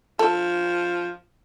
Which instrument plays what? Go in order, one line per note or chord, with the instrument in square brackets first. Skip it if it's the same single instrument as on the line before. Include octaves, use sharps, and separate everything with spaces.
[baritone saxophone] F3 [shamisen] A4